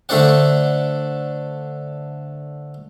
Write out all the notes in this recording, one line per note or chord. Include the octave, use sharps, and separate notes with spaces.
D3 A3 D4 C5 D5 F#5